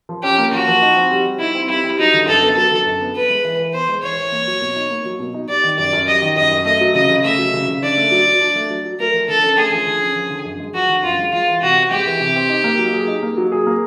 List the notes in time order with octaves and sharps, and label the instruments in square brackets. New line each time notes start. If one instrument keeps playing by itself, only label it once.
[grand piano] F3
[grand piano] C#4 [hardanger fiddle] G4
[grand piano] A#3
[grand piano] F3 [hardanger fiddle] F#4
[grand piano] F3
D#4
C4
G3
G3
[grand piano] D#4 [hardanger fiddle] E4
[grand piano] C4
[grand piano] G3 [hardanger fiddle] E4
[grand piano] G3
[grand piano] F#3 [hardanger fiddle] D#4
[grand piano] D3
[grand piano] F#2 [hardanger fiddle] A4
[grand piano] B3
[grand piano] F#3 [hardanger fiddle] A4
[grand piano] D3
F#2
B3
[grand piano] B3 [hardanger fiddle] B4
[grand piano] G#3
E3
E3
[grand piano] B3 [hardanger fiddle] C5
[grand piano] G#3
[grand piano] E3 [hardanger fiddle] C#5
[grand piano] E3
A#3
F#3
B2
D#4
A#3
F#3
B2
D#4
[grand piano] G3 [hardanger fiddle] D5
[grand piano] D#3
[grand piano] F#2 [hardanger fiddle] D5
[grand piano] F#2
[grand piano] G3 [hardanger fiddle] D#5
[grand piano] D#3
[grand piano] F#2 [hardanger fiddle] D#5
[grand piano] F#2
[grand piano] A3 [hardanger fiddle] D#5
[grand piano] F#3
[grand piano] C#3 [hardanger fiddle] D#5
[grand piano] C#3
[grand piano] A3 [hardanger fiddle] E5
[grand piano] F#3
C#3
C#3
[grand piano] D4 [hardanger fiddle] D5
[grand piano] A3
F#3
F#3
D4
A3
F#3
F#3
[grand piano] A3 [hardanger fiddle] A#4
[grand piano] F3
[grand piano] D3 [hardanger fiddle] A4
[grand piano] C#4
[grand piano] A3 [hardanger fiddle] G#4
[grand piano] F3
D3
C#4
F3
D3
F#2
G#3
[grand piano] F3 [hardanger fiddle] F#4
[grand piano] D3
[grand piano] F#2 [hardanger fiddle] F4
[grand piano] G#3
[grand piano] G#3 [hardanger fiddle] F4
[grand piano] E3
[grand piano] C3 [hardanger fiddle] F#4
[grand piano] C4
[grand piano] G#3 [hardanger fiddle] G4
[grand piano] E3
C3
C4
D#4
A#3
F#3
G#4
D#4
A#3
F#3
G#4
A#3